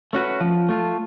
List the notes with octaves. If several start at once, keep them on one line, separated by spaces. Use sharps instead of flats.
A3 C#4 F#4 B4
F3
A3 F4